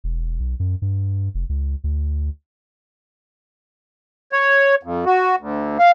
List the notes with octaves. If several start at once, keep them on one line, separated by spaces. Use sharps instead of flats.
E1
B1
F#2
G2
F1
C#2
D2
C#5
F2
F#4
D2
F5